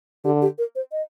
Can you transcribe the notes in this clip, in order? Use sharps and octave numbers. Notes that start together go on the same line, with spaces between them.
D3 G4
G4
A#4
C5
D#5